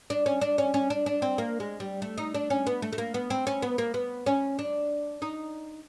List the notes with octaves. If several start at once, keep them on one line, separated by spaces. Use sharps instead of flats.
D4
C#4
D4
C#4
C#4
D4
D4
C4
A#3
G#3
G3
A3
D#4
D4
C#4
B3
A3
A3
A#3
B3
C4
C#4
B3
A#3
B3
C#4
D4
D#4